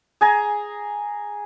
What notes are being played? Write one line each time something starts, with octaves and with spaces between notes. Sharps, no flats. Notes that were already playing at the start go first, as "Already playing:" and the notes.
G#4 G#5 A#5